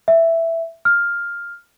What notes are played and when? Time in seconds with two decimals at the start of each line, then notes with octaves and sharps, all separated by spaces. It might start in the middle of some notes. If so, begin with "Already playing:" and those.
0.08 E5
0.85 F6